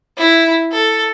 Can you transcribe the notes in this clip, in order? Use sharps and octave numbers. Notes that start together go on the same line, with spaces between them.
E4
A4